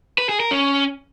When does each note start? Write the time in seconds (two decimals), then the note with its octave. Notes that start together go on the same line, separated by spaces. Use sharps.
0.18 B4
0.29 G#4
0.40 A#4
0.51 C#4